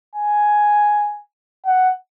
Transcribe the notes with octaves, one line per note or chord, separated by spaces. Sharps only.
G#5
F#5